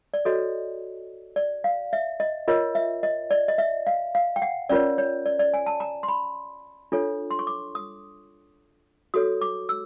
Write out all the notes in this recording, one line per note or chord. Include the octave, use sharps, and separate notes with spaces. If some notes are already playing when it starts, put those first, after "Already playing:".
D5
F#4 A4 C#5 D#5
D5
F5
E5
D#5
F4 A#4 C#5 D#5
E5
D#5
D5
D#5
E5
F5
F5
G5
F#5
C#4 F4 A#4 C#5 D5
C#5
D5
D5
G#5
A5
A#5
C6
B5
D4 F4 A4 C#5
C6
C#6
D6
D#6
F#4 A4 C#5 D#6
D6
E6